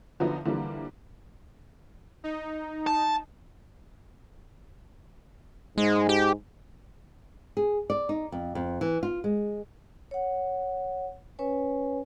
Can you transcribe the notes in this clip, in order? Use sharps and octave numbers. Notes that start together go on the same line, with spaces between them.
D3 F3 F#3 B3 D#4 E4
D3 E3 F3 G3 A#3
D#4
A5
G#2 G#3
G4
G#4
D5
D#4
F2
F2
E3
F4
G#3
C#5 F#5
C#4 B4 C#5 G#5